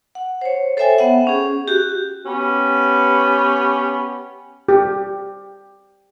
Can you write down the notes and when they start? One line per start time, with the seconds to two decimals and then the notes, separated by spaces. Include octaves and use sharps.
0.15 F#5
0.41 C5 C#5
0.77 A4 C5 C#5 E5 G5 G#5
0.98 B3 E5 F#5
1.27 C#4 G#4
1.68 F#4 G4
2.26 B3 C#4 G4
4.69 G4